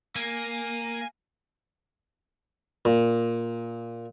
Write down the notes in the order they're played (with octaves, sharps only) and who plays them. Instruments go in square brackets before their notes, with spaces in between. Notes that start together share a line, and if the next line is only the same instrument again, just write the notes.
[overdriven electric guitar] A#3 [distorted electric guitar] G#5
[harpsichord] A#2